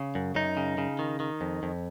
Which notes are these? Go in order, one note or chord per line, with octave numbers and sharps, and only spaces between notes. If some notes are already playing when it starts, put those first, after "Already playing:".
Already playing: C#3
F#2
F#2 D#4
C#3
C#3
D#3
D#3
F2
F2